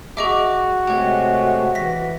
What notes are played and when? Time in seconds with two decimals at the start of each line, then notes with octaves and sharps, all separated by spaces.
0.17 F#4 G#4 D#5 E5 C#6 D6
0.87 C3 G#3 A3 G4 C#5
1.75 E3 A#6 B6